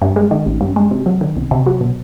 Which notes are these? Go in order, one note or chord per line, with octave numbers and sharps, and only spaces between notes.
G2
G#3
D#3
A1
G2
G#3
C3
F#3
D#3
C2
C3
F#3
B2